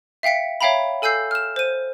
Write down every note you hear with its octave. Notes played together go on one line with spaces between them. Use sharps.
E5 F5 G5 B6 C#7
C#5 E5 F5 G5 A#5 B5
A4 G#5 E6 G6 C7
F6 E7
C5 D#7